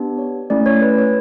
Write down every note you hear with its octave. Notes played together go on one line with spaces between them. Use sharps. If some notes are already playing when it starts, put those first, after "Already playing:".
Already playing: B3 D4 G4
C#5
A3 C#4 E4 D5
C#5
B4
C#5